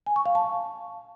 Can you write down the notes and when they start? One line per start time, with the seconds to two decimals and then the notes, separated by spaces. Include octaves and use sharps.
0.06 G#5
0.16 C#6
0.26 F5
0.35 A5